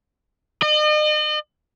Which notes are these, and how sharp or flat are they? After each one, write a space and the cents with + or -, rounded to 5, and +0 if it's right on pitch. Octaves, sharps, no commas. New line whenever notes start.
D#5 -40